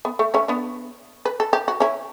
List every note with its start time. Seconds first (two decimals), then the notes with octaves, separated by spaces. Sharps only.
0.05 B3
0.19 A3
0.34 A3 C#4
0.48 B3 D4
1.25 B4
1.40 A4
1.53 G4
1.68 F#4
1.80 C#4 E4